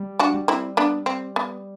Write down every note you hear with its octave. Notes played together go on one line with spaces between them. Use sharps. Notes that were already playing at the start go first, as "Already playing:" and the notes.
Already playing: G3
D4 F#4
G3
C4 E4
B3 D4
C4
B3